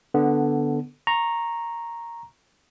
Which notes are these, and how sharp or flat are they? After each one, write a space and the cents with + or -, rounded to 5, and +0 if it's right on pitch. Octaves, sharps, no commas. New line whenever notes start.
D3 +0 B3 +0
A#5 +0 C#6 -20